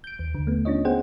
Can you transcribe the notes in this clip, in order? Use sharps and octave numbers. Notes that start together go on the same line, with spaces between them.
G6 D7
D#2
D#2 D3
A3 B3
C#4 D4 F4 C#5 D#5
B3 G#4 C5 F#5 G5